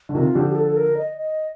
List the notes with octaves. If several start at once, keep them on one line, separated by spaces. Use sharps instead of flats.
D3
C3 D#3 F4
D3 F3 G4
G4
A4
A4
A#4
D#5
D#5